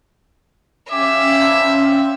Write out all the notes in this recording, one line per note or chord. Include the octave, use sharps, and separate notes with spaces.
C#4 G4 E5 F5 G#5 D6
C4 D4 E4
C4